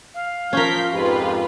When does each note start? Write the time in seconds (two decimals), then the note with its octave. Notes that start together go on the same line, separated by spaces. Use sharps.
0.15 F5
0.53 F3 C#4 A#4 G6 B6
0.93 F2 G#2 F4 G4 B4